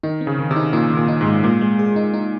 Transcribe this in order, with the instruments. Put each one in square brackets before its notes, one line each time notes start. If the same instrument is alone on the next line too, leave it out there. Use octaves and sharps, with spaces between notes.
[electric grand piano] D#3 [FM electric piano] D#4
[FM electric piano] C4
[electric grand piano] C#3
[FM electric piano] D#3
[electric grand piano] C3
[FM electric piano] D#4
[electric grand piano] A#2 [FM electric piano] D#4
[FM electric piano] D#3
[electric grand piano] A#2
[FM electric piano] D#4
[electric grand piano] G#2
[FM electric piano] G#3
[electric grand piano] A#2 [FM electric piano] G#3
[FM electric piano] G#3
G#4
D#4
D#4